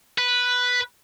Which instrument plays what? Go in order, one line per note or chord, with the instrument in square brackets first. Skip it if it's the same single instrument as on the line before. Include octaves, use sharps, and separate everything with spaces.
[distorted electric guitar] B4